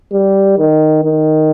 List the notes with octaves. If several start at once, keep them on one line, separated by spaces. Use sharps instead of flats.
G3
D#3
D#3